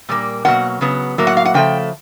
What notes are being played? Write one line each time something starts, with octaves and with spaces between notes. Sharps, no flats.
A#2 G3 A#3
B2 F#3 A#3 F#5
C#3 F#3 B3
A2 F#3 A#3
F#5
F5
F#5
C#3 F3 A3 G5